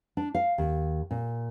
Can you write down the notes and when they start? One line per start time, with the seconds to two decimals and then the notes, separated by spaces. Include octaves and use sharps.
0.17 D4
0.35 F5
0.58 D#2
1.11 A#2